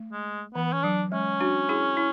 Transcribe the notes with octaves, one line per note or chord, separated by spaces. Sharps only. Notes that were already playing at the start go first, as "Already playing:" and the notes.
Already playing: A3
G#3
E3 B3
C#4
F#3 D4
G#3 C#4
D4 F#4
E4 G#4
E4